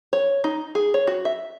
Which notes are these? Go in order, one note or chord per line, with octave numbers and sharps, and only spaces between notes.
C#5
D#4
G#4
C#5
F#4
E5